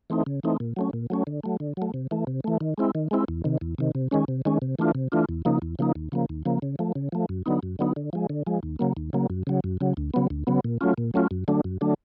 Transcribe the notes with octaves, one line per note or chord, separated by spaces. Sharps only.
E3 A3 C4 D#4
C#3
E3 A3 C4 D#4
A#2
F#3 A3 C#4
A#2
F#3 A3 C#4
D3
F#3 A3
D3
F#3 A3
C3
E3 A3
C3
E3 A3
D#3
G#3 C4 E4
D#3
G#3 C4 E4
E2
C3 D#3
E2
C3 D#3
C3
D#3 G#3 C#4
C3
D#3 G#3 C#4
C3
E3 A3 D4 F4
C3
E3 A3 D4 F4
E2
C#3 F3 A#3 D#4
E2
C#3 F3 A#3 D#4
D#2
C#3 F3 A#3
D#2
C#3 F3 A#3
C#3
F3 A3
C#3
F3 A3
F#2
D3 F#3 B3 D#4
F#2
D3 F#3 B3 D#4
D3
F3 G#3
D3
F3 G#3
D#2
C#3 F#3 A#3
D#2
C#3 F#3 A#3
F#2
C#3 F#3
F#2
C#3 F#3
D2
C#3 F#3 B3
D2
C#3 F#3 B3
A#2
F#3 A3 C#4 F4
A#2
F#3 A3 C#4 F4
F#2
D3 F#3 A3 D4
F#2
D3 F#3 A3 D4